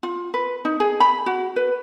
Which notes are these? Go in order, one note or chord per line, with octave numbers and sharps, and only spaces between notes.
F4
B4
D#4
G#4
B5
F#4
B4